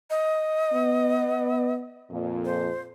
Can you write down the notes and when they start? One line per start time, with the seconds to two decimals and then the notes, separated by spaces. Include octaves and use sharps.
0.10 D#5
0.73 B3
2.11 F2 A#2
2.45 C5